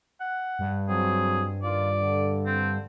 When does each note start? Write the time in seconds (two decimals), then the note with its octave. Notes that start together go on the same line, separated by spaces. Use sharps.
0.21 F#5
0.59 G2
0.88 F#3 C4 G#4
1.63 D#3 F4 D5
2.00 D3
2.46 C4